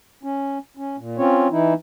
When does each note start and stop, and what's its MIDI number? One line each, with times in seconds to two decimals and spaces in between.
0.23 0.58 61
0.77 0.96 61
0.98 1.17 46
1.18 1.48 60
1.18 1.48 61
1.18 1.48 65
1.18 1.48 73
1.51 1.74 52
1.51 1.74 63
1.51 1.74 64